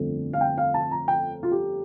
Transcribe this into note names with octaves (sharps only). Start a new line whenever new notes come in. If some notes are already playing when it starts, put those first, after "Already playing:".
Already playing: G1 F2 D3 A3 C4
F5
G5
F5
A5
A#5
G5
F4
G4